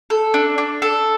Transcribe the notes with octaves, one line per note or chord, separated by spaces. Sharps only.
A4
D4
D4
A4